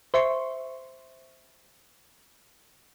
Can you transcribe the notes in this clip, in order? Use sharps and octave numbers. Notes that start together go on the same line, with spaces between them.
C5 E5 C6 C#6